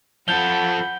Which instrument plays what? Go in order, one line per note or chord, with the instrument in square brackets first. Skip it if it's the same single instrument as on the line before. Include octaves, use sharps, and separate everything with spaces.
[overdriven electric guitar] F3 A4 [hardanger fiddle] F#5 B5 [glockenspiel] G6 G7